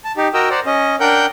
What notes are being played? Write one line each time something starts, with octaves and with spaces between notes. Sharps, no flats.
A5
D#4 G4
F#4 A#4 D#5 G5 A#5 E6
C5 D5 F#5 A#5
C#4 D#5
D4 A#4 F#5 G5 G6